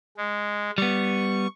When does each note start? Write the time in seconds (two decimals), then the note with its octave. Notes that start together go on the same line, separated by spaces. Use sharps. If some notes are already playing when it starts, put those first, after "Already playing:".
0.17 G#3
0.78 G3 B3 C#6